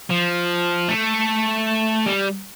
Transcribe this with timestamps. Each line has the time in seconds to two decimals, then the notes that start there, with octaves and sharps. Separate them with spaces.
0.10 F3
0.89 A3
2.06 G3